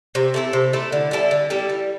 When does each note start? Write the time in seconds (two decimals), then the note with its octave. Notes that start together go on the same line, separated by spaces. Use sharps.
0.15 C3
0.34 A3 E4 A4
0.53 C3
0.73 A3 E4 A4
0.92 D3
1.11 G3 E4 A4
1.31 D3
1.50 G3 E4 A4
1.69 G3